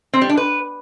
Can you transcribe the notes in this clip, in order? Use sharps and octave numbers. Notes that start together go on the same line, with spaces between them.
C4
G3
D4
B4